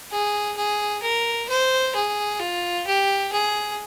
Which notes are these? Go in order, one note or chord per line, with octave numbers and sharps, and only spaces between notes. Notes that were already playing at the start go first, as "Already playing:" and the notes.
G#4
G#4
A#4
C5
G#4
F4
G4
G#4